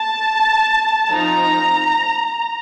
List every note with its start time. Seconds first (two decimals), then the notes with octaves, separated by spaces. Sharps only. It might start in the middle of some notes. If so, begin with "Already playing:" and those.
Already playing: A5
1.11 F3 C4 D#4 A#5